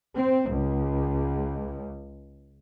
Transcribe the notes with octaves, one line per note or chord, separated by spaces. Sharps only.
C4
C#2